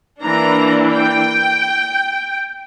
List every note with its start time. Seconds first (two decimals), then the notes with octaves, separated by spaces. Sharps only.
0.23 E3 A#3 D4 A#5
0.92 G5